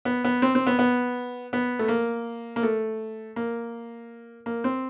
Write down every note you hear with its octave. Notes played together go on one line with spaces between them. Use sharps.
B3
B3
C4
C4
B3
B3
B3
A3
A#3
A#3
A3
A#3
A#3
C4